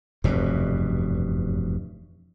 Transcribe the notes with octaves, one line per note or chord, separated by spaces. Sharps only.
F1 E2 G2 B2